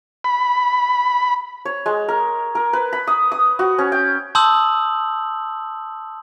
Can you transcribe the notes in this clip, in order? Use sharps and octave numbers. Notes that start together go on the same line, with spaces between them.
B5
C#5
G#3
A#4
A#4
B4
B5
D#6
D#6
F#4
C#4
G5
A5 C6 D#6 E6 G6 F#7